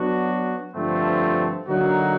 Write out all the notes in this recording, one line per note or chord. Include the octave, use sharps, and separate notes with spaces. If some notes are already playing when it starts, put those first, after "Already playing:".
Already playing: F#3 B3 D4 F#4
G2 D3 F3 A3 C4
D3 F#3 A#3 D#4 F#4